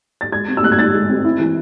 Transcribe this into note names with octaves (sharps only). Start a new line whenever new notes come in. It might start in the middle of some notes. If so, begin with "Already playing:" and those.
A6
G#3 G#6
C4
E6
A2 F#6
G#6
D#4 A6
G#3
C4
E4
E3